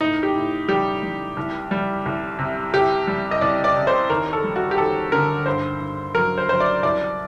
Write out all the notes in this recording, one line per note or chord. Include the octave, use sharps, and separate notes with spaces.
A2 D#4
G4
A2
G3 G4
G3
C2
G3
C2
C3
C2 G4
G3
D#5
C2 D5
D5
C3
C5
D#2 A#4
A4
G3
F#4
G4
D#2 A4
D3 A#4
G2 C5
G2
F#3 A#4
C5
F#3 C5
D5
C2 D5